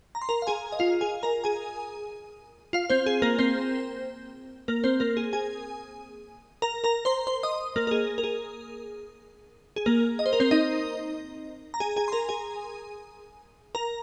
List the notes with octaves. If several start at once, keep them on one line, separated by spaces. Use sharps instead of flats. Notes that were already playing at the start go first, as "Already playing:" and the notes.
A#5
C6
A#4 A#5
F5
G#4 G#5
D#5
F4 F5
G#4 G#5
A#4 A#5
G#4 G#5
F4 F5
C4 C5
G#4
A#3 A#4
C4 C5
A#3 A#4
C4 C5
A#3 A#4
G#4
G#4 G#5
A#4 A#5
A#4 A#5
C5 C6
C5 C6
D#5 D#6
A#3 A#4
A#4
G#4
A#4
G#4
G#4
A#3 A#4
D#5
C5
A#4
C4 C5
D#4 D#5
A#5
G#4 G#5
G#4 G#5
C6
A#4 A#5
G#4 G#5
A#4 A#5